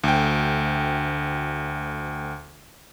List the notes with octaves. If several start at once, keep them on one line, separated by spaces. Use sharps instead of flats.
D2 G5